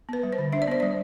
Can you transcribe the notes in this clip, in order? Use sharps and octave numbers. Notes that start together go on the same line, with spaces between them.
B3 B4
G3
C5
D3
D4 E5
D5
B3 C5
G3 D5